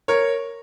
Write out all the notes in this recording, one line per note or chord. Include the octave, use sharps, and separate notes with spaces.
A#4 C#5